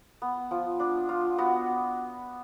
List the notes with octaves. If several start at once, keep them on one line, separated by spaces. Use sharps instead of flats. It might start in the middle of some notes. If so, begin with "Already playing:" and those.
B3
F3
D4
F4
B3 F#4